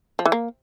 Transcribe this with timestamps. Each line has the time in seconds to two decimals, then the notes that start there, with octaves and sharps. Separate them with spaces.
0.19 F3
0.26 E3
0.32 A#3